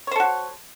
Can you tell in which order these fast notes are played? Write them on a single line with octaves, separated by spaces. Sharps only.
C#5 C5 A4 F#4